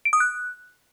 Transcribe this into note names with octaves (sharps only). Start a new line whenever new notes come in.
D7
D#6
F#6